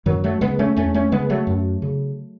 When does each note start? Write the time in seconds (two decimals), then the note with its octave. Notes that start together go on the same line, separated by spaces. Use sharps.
0.06 F#2 D#3 F#3
0.24 F#3 A3
0.41 C#3 G#3 B3
0.59 A3 C#4
0.76 E2 A3 C#4
0.94 A3 C#4
1.12 C#3 G#3 B3
1.30 F#3 A3
1.47 F#2
1.82 C#3